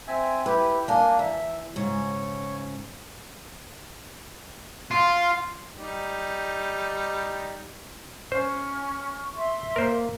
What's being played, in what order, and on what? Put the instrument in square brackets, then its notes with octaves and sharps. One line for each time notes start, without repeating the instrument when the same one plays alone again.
[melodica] C4 E5 G#5
[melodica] E4 G4 [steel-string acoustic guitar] B4
[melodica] A#3 D4 [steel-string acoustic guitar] D#5 G#5
[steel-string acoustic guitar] E2 [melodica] E5
[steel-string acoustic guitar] G#2 C#3 [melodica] C#5
[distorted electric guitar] F4
[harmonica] G3 D#4
[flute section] C#4 F6 [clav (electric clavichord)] C5 [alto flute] C#6
[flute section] E5 C6
[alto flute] A#3 [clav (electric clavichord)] A#4 C5